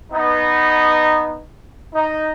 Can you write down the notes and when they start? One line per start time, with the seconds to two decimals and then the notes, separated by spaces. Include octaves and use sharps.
0.11 B3 D#4
1.92 D#4